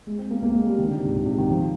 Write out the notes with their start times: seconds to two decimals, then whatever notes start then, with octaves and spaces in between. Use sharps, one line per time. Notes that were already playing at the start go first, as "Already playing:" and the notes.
0.07 G#3
0.18 C4
0.31 A#3
0.43 A#3
0.54 G#3
0.67 G3
0.78 D#3
0.87 D3
0.96 C3
1.05 G#2
1.14 A#2
1.26 C3
1.38 D#3
1.50 F3